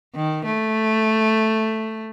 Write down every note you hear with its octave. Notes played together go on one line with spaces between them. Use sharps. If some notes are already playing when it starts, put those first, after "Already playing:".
D#3
A3